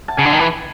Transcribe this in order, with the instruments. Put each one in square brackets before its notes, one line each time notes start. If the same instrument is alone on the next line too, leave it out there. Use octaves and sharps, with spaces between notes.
[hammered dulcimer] A5
[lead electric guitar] C#3 [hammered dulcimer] G#5
[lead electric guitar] D3
D#3
E3